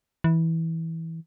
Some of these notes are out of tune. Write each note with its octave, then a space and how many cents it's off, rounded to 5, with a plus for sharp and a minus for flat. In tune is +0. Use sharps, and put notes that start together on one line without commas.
E3 -15